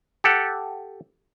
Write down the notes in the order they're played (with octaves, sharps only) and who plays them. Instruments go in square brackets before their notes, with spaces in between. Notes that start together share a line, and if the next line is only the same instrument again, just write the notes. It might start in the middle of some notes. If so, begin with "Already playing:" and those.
[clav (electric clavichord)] G4 A4 F#5